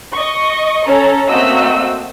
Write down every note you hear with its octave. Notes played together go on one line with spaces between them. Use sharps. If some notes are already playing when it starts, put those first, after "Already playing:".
D#5 C#6
C#4 A4 A#5
A3 A#3 C4 F#4 D#5 E6